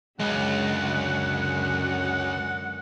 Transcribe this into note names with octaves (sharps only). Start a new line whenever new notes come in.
C#2 F#2 D3 G#3 F#5